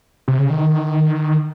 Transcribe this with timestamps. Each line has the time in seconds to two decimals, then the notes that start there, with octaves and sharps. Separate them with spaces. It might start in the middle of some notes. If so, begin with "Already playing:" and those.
0.28 C3
0.39 C#3
0.50 D#3